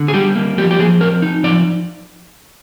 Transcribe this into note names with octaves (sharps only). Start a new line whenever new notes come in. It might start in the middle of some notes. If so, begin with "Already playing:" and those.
Already playing: D3
G#4
G3 G4
A#3
F3 G4
G4
F3 G#4
C4 A#4
D#4
F3 D5